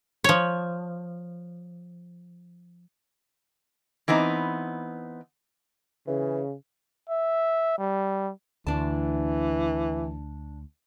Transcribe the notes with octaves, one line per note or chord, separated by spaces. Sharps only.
F3 C#5
E3 B3 C4 D#4
C#3 E3
E5
G3
D2 E3 D4 A5